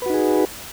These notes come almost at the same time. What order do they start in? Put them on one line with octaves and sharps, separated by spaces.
B4 F#4 D#4 G#4